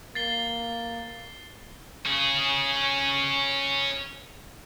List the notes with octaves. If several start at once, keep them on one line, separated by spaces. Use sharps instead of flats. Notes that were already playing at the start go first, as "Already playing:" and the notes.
A#3 A6 C7 G7
C#4 G#4